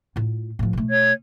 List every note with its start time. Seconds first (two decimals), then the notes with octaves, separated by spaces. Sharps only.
0.16 A2 F4
0.59 A2 F3
0.73 B2 A3
0.89 C#5 G#6